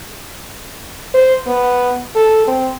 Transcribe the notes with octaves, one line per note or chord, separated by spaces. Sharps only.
C5
B3
A4
C4